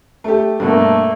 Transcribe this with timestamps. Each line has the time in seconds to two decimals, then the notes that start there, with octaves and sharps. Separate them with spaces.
0.24 A3 G4
0.60 G2 B2 A3 A#3